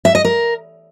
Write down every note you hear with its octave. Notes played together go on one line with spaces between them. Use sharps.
E5
D#5
A#4